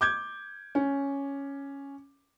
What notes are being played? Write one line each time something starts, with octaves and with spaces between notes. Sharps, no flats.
D6 G6 G#6
C#4